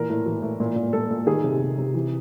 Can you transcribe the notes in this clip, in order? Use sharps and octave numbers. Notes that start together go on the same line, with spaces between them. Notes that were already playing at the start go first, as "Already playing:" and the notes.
Already playing: A#2 E3 A#4
A2
E3
A2
A#2
A#2
A#2 A4
A#2
D#3 G#4
C3
C3
C3
E3